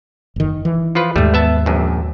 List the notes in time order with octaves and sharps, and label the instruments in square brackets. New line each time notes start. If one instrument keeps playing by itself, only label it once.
[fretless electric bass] F#1 D#3
E3
[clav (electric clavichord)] F3 F4 B4
[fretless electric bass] D#2 G#2 [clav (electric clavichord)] G3 A3
[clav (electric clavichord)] B3 E5 A5
A#1 F#2